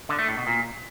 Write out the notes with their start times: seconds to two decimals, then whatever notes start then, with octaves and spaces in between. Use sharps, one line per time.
0.09 D3
0.19 A3
0.28 A2
0.37 B2
0.47 A#2